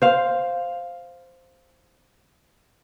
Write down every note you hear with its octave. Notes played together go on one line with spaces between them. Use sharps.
C5 F5